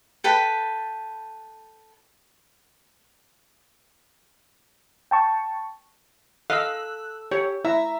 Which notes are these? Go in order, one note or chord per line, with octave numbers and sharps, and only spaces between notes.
A4 B4 G5 B5
G5 A5 C#6
A4 D#5 F5 E6 F#6
G4 C#5
E4 E5 A#5